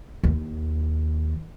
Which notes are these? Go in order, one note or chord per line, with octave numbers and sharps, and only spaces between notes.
D#2